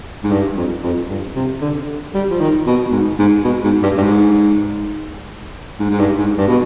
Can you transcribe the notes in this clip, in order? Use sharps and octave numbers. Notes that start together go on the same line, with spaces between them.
G#2
G2
F2
F2
G2
C3
D3
G3
F3
D#3
B2
G#2
G#2
B2
G#2
G2
G2
G#2
G#2
G#2
G2
G#2
G2
B2